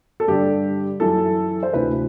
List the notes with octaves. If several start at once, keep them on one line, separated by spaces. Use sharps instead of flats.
A4
G2 D3 G4
F#2 E3 A4
C5
D2 C3 E3 B4